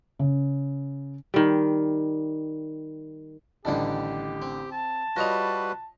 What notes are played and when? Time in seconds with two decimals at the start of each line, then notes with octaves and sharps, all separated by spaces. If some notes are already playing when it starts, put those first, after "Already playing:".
0.19 C#3
1.34 D#3 G3
3.65 A1 D3 D#3 G3 D4 G4 A5
4.42 C4
4.72 A5
5.16 G3 F4 F#4 B4 C#5 D#5 A#6 F7